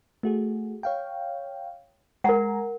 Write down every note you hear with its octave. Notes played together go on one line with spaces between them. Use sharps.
A3 F#4 G#4
C#5 F5 G5
G#3 A#4 F#5 G#5 A#5